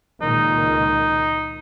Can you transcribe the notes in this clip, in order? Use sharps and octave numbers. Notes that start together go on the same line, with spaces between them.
C#2 A#2 D#3 D#4